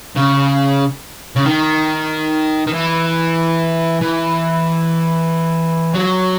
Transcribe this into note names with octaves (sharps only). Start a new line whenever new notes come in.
C#3
C#3
D#3
D#3
E3
E3
F#3